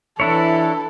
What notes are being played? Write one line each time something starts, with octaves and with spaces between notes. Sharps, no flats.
E3 D4 E4 A4 C#5